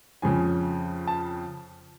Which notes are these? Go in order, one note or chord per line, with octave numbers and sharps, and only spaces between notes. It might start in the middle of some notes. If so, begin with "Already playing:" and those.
F2 C#3 F3 G#5
A5